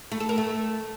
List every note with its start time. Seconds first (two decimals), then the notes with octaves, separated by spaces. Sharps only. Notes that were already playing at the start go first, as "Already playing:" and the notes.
0.12 A3
0.20 A4
0.29 A#4
0.38 A3